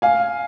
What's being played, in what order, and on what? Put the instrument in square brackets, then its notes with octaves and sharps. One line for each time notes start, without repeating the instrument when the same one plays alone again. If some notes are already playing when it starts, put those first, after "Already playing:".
[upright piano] F5 G#5